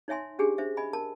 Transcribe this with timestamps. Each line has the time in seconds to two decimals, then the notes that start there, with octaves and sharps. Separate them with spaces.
0.08 D#4 C#5 E5 G#5 C6
0.39 C#4 D4 G4 G#4 G#5
0.58 D4 C5 E5
0.77 D#5 G#5 B5
0.93 A#4 A5